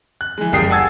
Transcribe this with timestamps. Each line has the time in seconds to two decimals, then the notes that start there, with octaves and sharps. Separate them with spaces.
0.21 F#6
0.38 E3 G#3
0.52 F#1 C#2 G3 G4 D#6 C7
0.70 F#5 G#5 A5 E6 G#6 A6